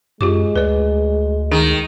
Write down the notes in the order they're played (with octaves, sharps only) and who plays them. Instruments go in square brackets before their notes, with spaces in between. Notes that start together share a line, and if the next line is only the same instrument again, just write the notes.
[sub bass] F#2 [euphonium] G#3 [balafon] F4 G4 D6
[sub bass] D2 [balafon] B4 D5
[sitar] D#3 [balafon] G#4 A#5